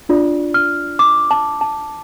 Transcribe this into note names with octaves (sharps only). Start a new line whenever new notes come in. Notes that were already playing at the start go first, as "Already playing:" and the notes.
D4 F4 D5
F6
D6
A5
A5